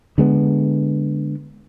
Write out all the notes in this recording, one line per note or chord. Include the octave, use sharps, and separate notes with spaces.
D3 G#3 B3